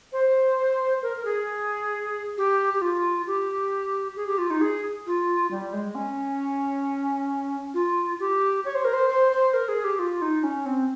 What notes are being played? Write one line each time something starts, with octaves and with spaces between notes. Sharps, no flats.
C5
A#4
A#4
G#4
G4
G4
F4
G4
G#4
G4
F4
D#4
G#4
F4
G3
G#3
C#4
F4
G4
C#5
C5
A#4
C5
C5
C5
A#4
G#4
G4
F4
D#4
C#4
C4